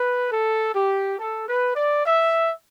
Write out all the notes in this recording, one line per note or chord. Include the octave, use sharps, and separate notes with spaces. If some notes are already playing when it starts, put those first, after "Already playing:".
Already playing: B4
A4
G4
A4
B4
D5
E5